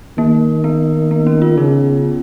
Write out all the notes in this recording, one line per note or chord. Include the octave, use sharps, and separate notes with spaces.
D#3 A#3
B3
B3
C#4
F4
C#3 D#4